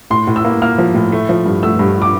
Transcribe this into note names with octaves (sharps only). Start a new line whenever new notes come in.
A2 C6
A2
E6
A#3
A#3 F6
F3
A2
A3
F3
G2
A3 E6
G2
D6